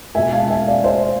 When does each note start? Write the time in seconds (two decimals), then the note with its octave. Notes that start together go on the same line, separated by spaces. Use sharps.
0.15 B2 G#3 E5 G#5
0.32 F5 A5
0.50 E5 G#5
0.67 D5 F5
0.84 C5 E5